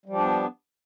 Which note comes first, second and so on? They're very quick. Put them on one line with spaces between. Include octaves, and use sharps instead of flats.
G3 F3 G4 D4 B3